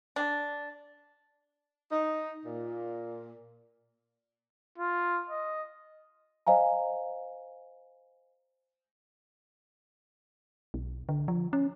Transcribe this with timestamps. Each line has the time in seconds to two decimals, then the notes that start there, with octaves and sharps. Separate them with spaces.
0.16 D4
1.92 D#4
2.46 A#2
4.78 F4
5.29 D#5
6.47 C5 D#5 F5 G#5 A#5
10.74 B1
11.09 D3
11.28 F3
11.53 C#4